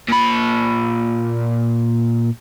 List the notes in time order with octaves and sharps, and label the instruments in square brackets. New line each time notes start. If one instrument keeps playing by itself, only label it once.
[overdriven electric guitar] A#2 B5